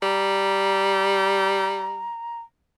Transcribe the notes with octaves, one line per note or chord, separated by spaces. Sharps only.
G3 A#5